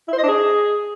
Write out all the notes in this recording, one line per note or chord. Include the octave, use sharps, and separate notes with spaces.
E4
C5
D#5
D4
G#4